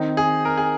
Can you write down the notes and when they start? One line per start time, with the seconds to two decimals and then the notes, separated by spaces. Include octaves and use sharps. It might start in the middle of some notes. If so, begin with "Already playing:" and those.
Already playing: D#3 C4 D#4
0.17 G#4
0.45 A#4
0.57 G#4